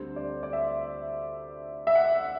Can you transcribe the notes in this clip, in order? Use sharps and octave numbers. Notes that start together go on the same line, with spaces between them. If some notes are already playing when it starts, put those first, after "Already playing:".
Already playing: D2 D3 G3 C4 C5
D5
D5
E5
E5
F#5